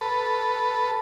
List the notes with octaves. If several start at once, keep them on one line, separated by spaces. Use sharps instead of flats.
A4 B4